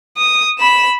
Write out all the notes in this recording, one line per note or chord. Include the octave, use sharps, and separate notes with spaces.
D#6
B5 E7